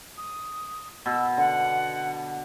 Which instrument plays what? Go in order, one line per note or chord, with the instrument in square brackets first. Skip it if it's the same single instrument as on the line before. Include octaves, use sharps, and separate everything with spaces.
[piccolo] D#6
[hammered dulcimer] B2 [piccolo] E6
[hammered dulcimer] D3 [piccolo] F#5